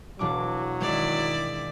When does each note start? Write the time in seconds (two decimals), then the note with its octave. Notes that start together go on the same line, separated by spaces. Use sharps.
0.19 E1 F#3 D4 D6
0.81 D#3 G#3 E4 D5